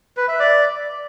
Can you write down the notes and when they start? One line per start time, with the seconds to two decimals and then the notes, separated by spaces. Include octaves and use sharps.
0.17 B4
0.28 E5
0.40 D5